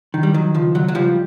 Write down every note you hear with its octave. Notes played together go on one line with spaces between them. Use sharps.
D#3
G3
D#3 F#3
C#2 F3
C#2 F#3
F#3
C#2 F3 G3